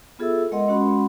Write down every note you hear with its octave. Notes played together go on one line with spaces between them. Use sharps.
B3 F4 G#4 A4 E5 E6
G#3 A#4 D#5 F#5 C6
G#3 C#4 F#4 F#5 B5 C6